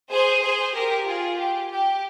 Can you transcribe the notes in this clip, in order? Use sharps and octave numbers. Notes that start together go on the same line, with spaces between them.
G#4 C5
G#4 C5
G4 A#4
F4 G#4
G4
G4